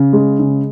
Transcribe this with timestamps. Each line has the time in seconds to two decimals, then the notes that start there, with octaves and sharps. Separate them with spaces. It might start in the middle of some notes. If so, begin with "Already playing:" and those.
Already playing: C#3
0.13 G#3
0.39 C#3